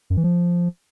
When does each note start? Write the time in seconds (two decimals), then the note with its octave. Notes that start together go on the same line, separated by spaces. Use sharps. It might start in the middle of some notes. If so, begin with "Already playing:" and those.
0.10 F#2
0.17 E3
0.24 F3